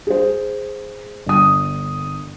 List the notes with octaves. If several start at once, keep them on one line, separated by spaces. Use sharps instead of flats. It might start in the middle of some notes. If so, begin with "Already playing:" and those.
G#4 C5
G1 D#6